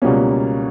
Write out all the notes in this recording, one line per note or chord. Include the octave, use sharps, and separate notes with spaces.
C#2 B2 G3 A#3 C#4